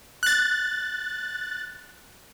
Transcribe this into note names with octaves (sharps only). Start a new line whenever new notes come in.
F#6 A6